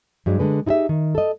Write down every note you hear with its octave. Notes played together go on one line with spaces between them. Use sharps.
G2 F#3 G#3
D3 G#3 B4
D#4 E4 G4 G#4 E5
D#3
A4 D#5